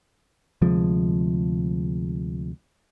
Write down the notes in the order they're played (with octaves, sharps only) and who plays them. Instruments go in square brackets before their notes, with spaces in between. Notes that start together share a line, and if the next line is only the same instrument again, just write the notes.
[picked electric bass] D2 C3 F3 G#3